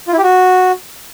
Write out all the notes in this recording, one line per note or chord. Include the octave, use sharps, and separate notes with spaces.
F4
E4
G4
F#4